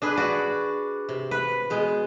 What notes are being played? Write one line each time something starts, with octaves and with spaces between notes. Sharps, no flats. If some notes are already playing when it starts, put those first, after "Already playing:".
D4 G#4 B4
F#4 D5
C3
B4
B2 G#3